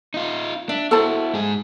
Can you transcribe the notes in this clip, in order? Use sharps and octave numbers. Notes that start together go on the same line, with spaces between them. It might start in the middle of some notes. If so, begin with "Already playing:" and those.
D#4 F4
D4 E5
E4 F#4 A4 C5 A5
G#2 G#4